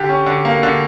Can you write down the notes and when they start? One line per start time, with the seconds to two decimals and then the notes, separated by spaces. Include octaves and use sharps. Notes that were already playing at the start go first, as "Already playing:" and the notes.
Already playing: D3 G4
0.09 C#4
0.26 D3
0.45 A#3
0.63 D3